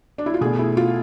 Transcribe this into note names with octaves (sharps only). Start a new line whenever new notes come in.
D4
E4
F4
B2 A3 G#4
E4
F4